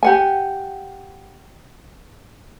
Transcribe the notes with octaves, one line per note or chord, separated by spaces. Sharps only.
G4 F#5 G#5